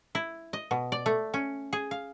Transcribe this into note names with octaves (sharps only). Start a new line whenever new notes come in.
E4
D#5
B2
D5
A3
C#4
G#4
F5